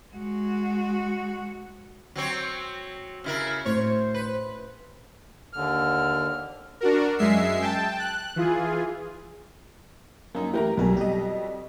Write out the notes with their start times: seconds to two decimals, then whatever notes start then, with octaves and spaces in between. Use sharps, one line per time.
0.13 G#3 F#4
2.16 F#3 C4 C#5
3.24 C#3 E4 A#4
3.66 A2 C5 C#5
4.14 B4
5.53 D#2 D3 F6
6.81 D4 F#4 A#4
7.18 F#2 G#3 E5 C7
7.62 G5 A5
7.99 F#6
8.36 E3 F4 G#4
10.35 F#2 A#3 D#4
10.54 E3 A3 G4 A#4 A#5
10.77 B1 F2 B2 G3 A#4 G#5
10.97 G4 D#5